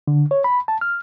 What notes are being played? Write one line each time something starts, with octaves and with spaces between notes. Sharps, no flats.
D3
C#5
B5
A5
F6